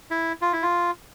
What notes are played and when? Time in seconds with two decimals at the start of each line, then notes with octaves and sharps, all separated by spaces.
0.11 E4
0.42 F4
0.53 E4
0.62 F4